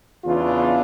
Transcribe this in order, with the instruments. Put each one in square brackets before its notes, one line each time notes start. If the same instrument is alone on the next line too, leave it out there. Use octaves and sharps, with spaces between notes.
[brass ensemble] E2 C#3 E3 D4 F4